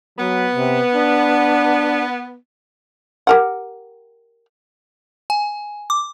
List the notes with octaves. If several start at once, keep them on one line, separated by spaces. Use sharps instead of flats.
F#3 B3
C3
D4
G4 A#4 F#5
G#5
D6